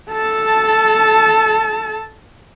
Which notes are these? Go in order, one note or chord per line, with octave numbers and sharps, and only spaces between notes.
A4 A5